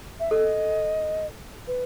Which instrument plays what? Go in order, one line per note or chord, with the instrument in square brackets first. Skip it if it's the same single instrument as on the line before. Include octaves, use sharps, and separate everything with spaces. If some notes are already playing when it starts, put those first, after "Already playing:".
[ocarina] E5
[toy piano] A4 [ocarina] D#5
[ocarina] B4